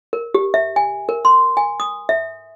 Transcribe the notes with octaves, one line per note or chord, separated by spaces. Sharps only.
A#4
G4
E5
G#5
A#4
C6
G#5
D#6
E5